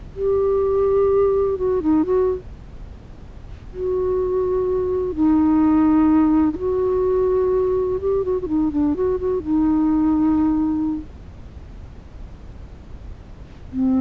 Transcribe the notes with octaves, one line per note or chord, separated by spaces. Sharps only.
G4
F#4
D#4
F#4
F#4
D#4
D#4
F#4
G4
F#4
F#4
D#4
D4
F#4
F#4
D#4
C4